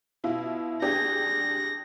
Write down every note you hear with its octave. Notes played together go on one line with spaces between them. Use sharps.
B2 E4 F4
D4 G4 G#4 A#6